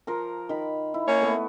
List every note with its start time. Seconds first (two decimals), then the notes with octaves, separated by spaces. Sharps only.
0.07 F3 A#4 A#5
0.49 D#3 B5
0.94 E4
1.08 A#3 C#4 C#5
1.22 A3 B3